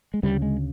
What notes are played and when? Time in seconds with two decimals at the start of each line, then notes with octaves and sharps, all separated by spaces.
0.14 G#3
0.23 D2 C#3 G3
0.42 G#3